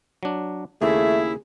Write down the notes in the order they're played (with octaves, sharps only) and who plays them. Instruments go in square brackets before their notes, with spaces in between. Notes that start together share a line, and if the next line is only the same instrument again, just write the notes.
[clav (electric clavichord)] F#3 D4
[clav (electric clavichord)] D#2 C#3 A#3 [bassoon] A3 [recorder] E4 [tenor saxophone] G#4